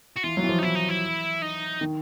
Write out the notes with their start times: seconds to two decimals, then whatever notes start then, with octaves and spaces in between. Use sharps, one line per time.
0.16 F#4
0.23 E3 F4
0.37 F#3
0.44 E3
0.49 F3
0.59 D#4
0.63 E3 E4
0.75 D#4
0.89 E4
1.42 D#4
1.81 D#3